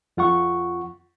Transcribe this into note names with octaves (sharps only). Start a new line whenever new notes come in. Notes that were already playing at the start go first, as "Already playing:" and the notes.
F2 F4 F#5 C#6